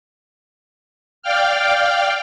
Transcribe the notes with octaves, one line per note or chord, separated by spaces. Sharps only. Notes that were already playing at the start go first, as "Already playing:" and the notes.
D5 F5 G5 F6